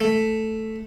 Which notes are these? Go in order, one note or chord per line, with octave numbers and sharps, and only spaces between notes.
A3